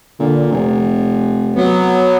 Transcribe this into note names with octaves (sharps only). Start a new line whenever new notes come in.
A#2 D3
F1 C3
F#3 B3